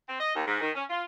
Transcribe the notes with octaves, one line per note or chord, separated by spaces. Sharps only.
C4
D#5
D#2
G#2
D#3
C#4
F4